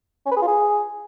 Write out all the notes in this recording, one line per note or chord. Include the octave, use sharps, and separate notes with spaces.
C#4
B4
G#4
F4
G#4